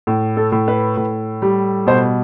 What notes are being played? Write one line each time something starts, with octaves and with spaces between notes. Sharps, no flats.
A2
A4
A2
B4
A2
G3
B2 C5